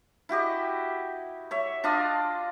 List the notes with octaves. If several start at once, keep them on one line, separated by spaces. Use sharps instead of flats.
E4 F#4 G4 D#5
C#5 E5
D4 F4 D#5 C6